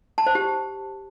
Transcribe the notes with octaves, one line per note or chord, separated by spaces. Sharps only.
A5
C5
G4